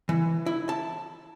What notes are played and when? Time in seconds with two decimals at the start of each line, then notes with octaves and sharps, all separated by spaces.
0.09 E3
0.46 E4
0.69 A5